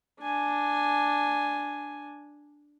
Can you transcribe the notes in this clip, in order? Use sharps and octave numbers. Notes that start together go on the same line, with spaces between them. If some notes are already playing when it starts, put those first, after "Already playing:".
D4 G#5